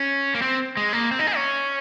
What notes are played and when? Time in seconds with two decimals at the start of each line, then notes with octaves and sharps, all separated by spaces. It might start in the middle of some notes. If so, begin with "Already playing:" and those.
Already playing: C#4
0.35 A#3
0.42 C4
0.77 G#3
0.93 A#3
1.11 C4
1.19 D#4
1.27 G#4
1.36 C#4